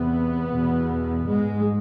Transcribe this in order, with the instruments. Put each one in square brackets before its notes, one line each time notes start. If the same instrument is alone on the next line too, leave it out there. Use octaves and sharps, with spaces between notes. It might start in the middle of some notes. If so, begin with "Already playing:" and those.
Already playing: [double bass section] E2 C3 B3
E2 B2
G#2 G#3